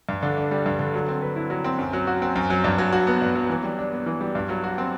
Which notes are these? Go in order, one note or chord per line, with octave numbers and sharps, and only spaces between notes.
G2
D3
D4
G3
G2
D3
F#3
C4
B4
E4
F#3
C4
F#2
F#3
F#4
C4
F#2
F#3
G2
F#3
F#4
B3
G2
F#3
E3
G3
D4
B3
E3
G3
G2
F#3
F#4
C4